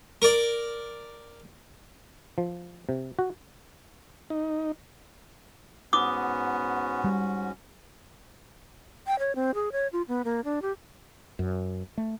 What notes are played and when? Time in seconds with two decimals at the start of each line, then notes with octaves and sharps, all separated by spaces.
0.22 A#4 D5
2.38 F3
2.89 C3
3.19 F#4
4.30 D#4
5.93 G#2 B3 C#4 F#4 D6 D#6
7.04 G3
9.07 G5
9.19 C#5
9.36 C4
9.55 G#4
9.72 C#5
9.93 F4
10.08 B3
10.25 A#3
10.45 D4
10.62 G4
11.39 F#2
11.98 A3